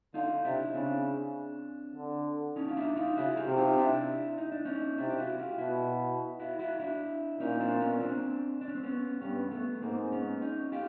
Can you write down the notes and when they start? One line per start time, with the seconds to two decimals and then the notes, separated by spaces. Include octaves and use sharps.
0.14 D3 D#4 F4
0.45 C3 D4 E4
0.74 C#3 C4 D4
1.95 D3
2.56 C#4 D#4
2.68 F4
2.77 D4 E4
2.96 D#4 F4
3.17 C#3 E4 F#4
3.37 F4 G4
3.47 C3
3.58 D#4 F4
3.77 D4 E4
4.38 D#4
4.52 D4
4.65 C#4 D#4
4.98 C3 D4 E4
5.09 G4
5.18 E4 F#4
5.38 F4 G4
5.58 B2 E4 F#4
6.40 E4 F#4
6.59 E4 F#4
6.79 D4 E4
7.40 A#2 C#4 D#4
7.60 C4 D4
7.80 B3 C#4
8.00 C4 D4
8.61 D4
8.68 C#4
8.75 C4
8.83 B3 C#4
9.21 G2 B3 C#4
9.51 A3 B3
9.82 G#2 A#3 C4
10.12 B3 C#4
10.42 C#4 D#4
10.72 F4 G4